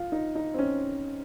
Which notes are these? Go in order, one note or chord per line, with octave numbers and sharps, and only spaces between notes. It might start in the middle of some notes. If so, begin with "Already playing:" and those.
Already playing: F4
D#4
D#4
C4
C#4